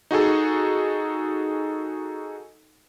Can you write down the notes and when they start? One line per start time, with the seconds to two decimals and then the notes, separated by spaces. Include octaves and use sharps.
0.11 D#4 F#4 G#4 A4